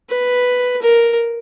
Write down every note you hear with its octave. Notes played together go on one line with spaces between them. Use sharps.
B4
A#4